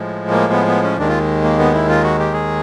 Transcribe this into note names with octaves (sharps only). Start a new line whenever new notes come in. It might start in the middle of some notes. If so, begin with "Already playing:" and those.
Already playing: A2 F3 G#3
A#3
B3
B3
C#4
D#2 D#3 G#3 D4
F4
A#3
B3
E4
F4
F#4
G4
G#4